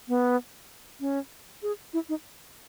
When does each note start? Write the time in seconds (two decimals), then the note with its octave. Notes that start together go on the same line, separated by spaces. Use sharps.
0.08 B3
1.00 C#4
1.63 G#4
1.93 E4
2.09 D#4